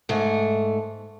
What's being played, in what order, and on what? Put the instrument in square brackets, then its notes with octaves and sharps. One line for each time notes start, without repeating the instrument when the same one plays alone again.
[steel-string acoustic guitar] G#2 A3